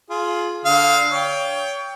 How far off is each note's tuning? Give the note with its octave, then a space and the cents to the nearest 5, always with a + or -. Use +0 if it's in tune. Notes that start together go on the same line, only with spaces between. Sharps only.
F4 +0 G#4 +25
D3 +0 F5 +0 D#6 +45
C#5 +25 G5 +5